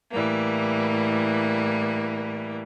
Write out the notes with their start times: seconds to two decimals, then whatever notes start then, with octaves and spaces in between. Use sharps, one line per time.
0.12 A2 E3 G3 A#3